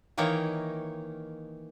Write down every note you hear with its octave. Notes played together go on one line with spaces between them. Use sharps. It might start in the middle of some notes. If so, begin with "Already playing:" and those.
D#3 E3 A#3 D#4 C#5 G5